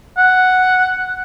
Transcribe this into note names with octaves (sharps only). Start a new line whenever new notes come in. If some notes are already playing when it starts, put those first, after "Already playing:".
F#5